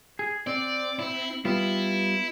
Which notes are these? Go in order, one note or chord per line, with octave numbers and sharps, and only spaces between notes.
G#4
C4 D5
E4
G3 B3 E4 F4